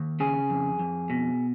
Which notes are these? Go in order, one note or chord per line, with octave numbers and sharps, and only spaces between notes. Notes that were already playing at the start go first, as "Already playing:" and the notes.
Already playing: D#2
C#3 G#4
F2
F2
B2